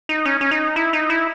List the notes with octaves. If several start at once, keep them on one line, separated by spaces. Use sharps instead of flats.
D#4
C#4
C#4
D#4
E4
D#4
E4